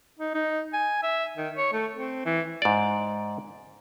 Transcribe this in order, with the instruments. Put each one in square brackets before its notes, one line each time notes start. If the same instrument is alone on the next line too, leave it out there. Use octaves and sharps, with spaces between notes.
[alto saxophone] D#4
D#4
G#5
E5
D#3
C#5
A3
C4
E3
[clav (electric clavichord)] G#2 D5